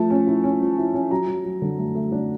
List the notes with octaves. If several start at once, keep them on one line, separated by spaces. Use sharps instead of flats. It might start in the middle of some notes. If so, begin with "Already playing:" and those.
Already playing: F3 A3 A5
C#4
E4
C#4
F3
E4
C#4
F#3 A#5
F#3
F#3
D3
A3
A3
D4